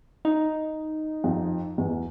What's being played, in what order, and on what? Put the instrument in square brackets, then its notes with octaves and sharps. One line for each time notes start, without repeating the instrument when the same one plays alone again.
[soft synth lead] D#4
[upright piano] F2
E2